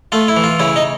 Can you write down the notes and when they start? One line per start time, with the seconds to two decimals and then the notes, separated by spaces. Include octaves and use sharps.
0.12 A3 F4
0.28 E4
0.36 E3
0.44 F4
0.59 C#3 E4
0.76 D#4